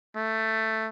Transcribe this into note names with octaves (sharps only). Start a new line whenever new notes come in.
A3